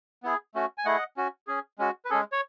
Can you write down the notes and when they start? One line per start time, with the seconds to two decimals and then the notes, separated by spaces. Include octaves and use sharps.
0.23 B3 E4 G#4
0.55 A3 C#4 F#4
0.78 G#5
0.85 A3 E4 G#4 D#5 F#5
1.17 C#4 F#4
1.47 C#4 G#4
1.79 G#3 C#4 F#4
2.05 B4
2.10 G#3 C#4 G#4 A4
2.32 C#5